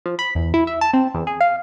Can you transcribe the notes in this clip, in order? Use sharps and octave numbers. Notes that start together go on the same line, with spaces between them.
F3
B5
E2
E4
E5
A5
C4
E2
G#4
F5